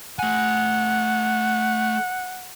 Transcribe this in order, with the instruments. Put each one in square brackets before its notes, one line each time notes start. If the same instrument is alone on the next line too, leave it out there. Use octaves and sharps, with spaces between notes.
[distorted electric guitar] A3 G#5 [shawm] F#5